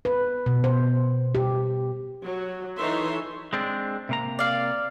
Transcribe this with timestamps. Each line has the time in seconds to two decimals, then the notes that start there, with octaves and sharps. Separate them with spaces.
0.05 B4
0.46 B2
0.64 C5
1.35 G4
2.23 F#3
2.78 E3 D#4 A4 C#5 E5 C6
3.53 G#3 C4 D4
4.09 C3 A#3 A#5
4.39 D5 F5